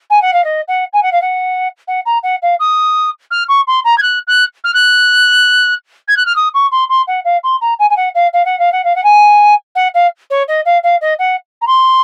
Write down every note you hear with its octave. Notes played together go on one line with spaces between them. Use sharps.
G#5
F#5
F5
D#5
F#5
G#5
F#5
F5
F#5
F#5
A#5
F#5
F5
D#6
F6
C#6
C6
A#5
G#6
F#6
F#6
F6
F#6
G#6
F#6
F6
D#6
C#6
C6
C6
F#5
F5
C6
A#5
G#5
G#5
F#5
F5
F5
F#5
F5
F#5
F5
F#5
G#5
F#5
F5
C#5
D#5
F5
F5
D#5
F#5
A#5
C6